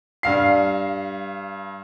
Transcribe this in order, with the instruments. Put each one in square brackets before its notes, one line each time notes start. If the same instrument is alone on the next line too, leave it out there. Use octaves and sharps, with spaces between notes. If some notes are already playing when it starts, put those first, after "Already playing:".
[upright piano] G2 F5 C7